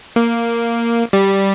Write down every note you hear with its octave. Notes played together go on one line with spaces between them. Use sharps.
A#3
G3